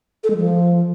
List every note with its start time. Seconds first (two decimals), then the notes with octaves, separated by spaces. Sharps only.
0.24 A4
0.30 G#3
0.37 F3